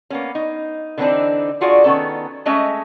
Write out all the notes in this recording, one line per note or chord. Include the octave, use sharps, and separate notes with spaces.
A#3 B3 C#4
D#4
D3 E3 B3 C4 D4 D#4
D4 F4 F#4 G#4 D5
D#3 B3 C#4 A4
G#3 A3 C#4 D#5 E5